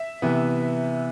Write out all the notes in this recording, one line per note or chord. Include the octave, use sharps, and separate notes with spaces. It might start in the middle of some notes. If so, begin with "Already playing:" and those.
Already playing: E5
C3 E3 B3